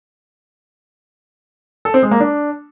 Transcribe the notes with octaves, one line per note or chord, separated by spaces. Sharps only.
A4
C4
G#3
A#3
D4